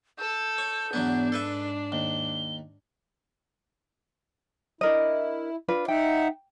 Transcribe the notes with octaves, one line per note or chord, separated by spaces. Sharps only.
A4 G6
C#5
E2 G#2 F#3 B3 D4
A4 B4 E5
D#2 G7
D4 E4 A#4 D#5
D4 F4 B4
D#4 E5 F#5 G5